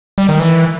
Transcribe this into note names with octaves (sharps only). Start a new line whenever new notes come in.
G3
D#3
E3